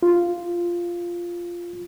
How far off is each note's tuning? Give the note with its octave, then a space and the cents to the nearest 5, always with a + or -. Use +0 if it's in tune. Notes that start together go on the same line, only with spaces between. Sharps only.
F4 -5